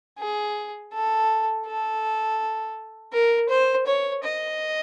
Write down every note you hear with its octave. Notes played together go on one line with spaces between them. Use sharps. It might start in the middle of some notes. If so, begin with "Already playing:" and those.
G#4
A4
A4
A#4
C5
C#5
D#5